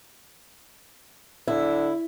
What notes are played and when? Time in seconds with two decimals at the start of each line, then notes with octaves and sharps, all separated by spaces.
1.48 D3 E4